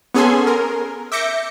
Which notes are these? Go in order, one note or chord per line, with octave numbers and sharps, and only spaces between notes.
B3 C#4 G#4 A4 G#5 C6
A#4
E5 D6 G6 A#6 C#7